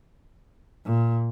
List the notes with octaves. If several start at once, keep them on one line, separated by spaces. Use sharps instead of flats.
A#2